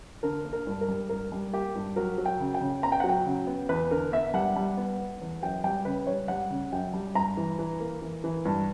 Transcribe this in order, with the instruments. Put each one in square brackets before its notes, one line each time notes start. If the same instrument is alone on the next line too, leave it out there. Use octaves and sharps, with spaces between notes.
[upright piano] D3 A#4
A#3
A#4
G2
A#4
G3
G2 A#4
G3
A#3 G4
G2
F#3 A#4
F#3
G5
C#3
G5
C#3
B3 A#5
G5
F#3 F#5
G5
C#3
B3
E2 B4
D3 A#4
B3 E5
G3 F#5
G3
B3
B3
E2
F#2 G5
G3 G5
C#3 B4
G3 C#5
G3 F#5
C#3
F#2 G5
G3
G2 A#5
E3
E3
A#3
E3
E3
G2